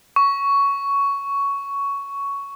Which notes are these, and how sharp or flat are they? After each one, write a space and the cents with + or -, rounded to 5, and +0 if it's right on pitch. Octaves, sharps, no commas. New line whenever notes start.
C#6 +10